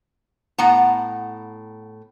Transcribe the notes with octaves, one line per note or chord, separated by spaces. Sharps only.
A2 B3 F#5 A#5